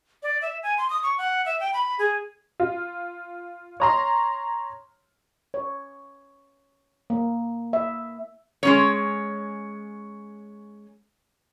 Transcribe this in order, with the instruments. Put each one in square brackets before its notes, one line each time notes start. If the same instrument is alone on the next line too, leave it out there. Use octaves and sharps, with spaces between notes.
[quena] D5
E5
G#5
C6
D#6
C#6
F#5
E5
G5
B5
G#4
[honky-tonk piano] F4
C#5 A#5 C6
[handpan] C#5
A#3
E5
[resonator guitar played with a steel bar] G#3 C#4 C#5